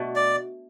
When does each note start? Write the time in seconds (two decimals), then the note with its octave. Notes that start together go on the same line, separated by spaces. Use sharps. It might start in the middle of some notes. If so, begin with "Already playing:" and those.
Already playing: B2 A3 D4
0.16 D5